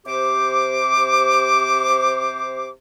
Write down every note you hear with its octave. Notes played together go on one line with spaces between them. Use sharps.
C3 G4 C5 D6